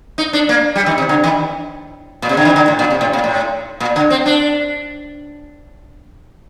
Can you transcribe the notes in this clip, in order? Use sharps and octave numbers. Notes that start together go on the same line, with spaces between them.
D#4
D4
A#3
G3
D#3
C3
D3
D#3
A#2
C3
D3
D#3
D3
A2
A#2
C3
A2
A#2
A2
A#2
D3
C4
D4